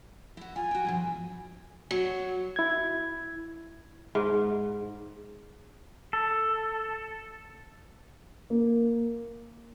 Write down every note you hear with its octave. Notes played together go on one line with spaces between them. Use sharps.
E4 F#4
F4 G#5
F#4 G5
G2 B2 F3
F#3
E4 G#6
G#2
A4
A#3